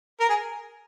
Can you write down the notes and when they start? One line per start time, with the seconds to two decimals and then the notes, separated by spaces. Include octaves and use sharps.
0.20 A#4
0.29 G#4